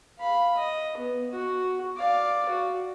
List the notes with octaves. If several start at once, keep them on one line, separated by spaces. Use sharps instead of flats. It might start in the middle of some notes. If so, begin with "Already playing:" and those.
F5 B5
D#5
B3
F#4
D5 F5
F#4